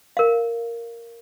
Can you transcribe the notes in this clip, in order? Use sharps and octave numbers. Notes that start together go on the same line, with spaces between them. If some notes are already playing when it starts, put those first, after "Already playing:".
A#4 F5